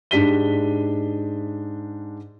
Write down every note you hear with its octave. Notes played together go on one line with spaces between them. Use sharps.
G#2 D4 G4 B6 D#7 G7